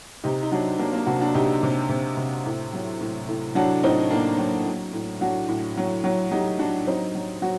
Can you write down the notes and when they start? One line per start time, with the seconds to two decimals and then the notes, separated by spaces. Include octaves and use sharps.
0.24 C3 D#4 G4
0.43 D#4
0.52 F#3 D4 F#4
0.79 F#3 A#3 D4
0.93 A#3 D4
1.06 C3 D4 F#4
1.20 D4 F#4
1.34 C3 D#4 G4
1.63 C3
1.89 C3
2.17 C3
2.46 A2
2.73 F#3
3.01 A2
3.29 A2
3.55 F#3 D4 F#4
3.83 A2 C4 D#4
4.11 A2 A#3 D4
4.38 F#3
4.66 F#3
4.93 A2
5.21 F#3 D4 F#4
5.49 A2
5.77 F#3
6.04 F#3
6.31 F#3 D#4 G4
6.59 F#3 D4 F#4
6.87 F#3 C4 D#4
7.15 F#3
7.42 F#3 F#4